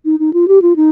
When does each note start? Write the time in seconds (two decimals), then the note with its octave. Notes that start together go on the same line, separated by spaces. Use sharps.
0.05 D#4
0.19 D#4
0.33 F4
0.48 G4
0.62 F4
0.76 D#4